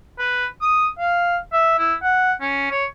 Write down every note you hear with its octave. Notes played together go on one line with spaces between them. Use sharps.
B4
D#6
F5
E5
E4
F#5
C#4
C#5